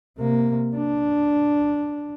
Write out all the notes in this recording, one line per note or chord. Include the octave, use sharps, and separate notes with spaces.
C3 A#3
D4